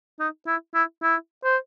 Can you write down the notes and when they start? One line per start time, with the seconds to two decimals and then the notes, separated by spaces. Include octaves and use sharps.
0.20 D#4
0.47 E4
0.75 E4
1.03 E4
1.44 C5